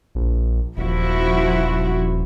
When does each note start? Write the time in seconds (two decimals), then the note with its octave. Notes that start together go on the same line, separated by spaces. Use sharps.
0.15 A#1
0.77 D#1 F3 E4 F#4